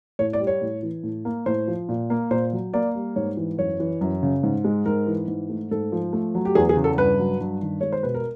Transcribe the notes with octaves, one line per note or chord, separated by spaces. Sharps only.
A2 C#5
D5
G3
C#5
A2
E3
A2
A#3
A2 C5
F3
A#2
A#3
A#2 C5
F#3
A#3 D5
G3
G#2 C#5
E3
F#2 C#5
E3
F#2
C#3
G#2
G#3
G#2 A#4
E3
G#2
A3
G#2 A4
F3
A3
F#3
G4
E2 G#4
G#4
C#3
A4
G2 B4
F#3
G2
D#3
G#3 C#5
C5
B2 B4
A#4